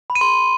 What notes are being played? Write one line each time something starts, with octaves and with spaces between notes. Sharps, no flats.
B5
D#7
C6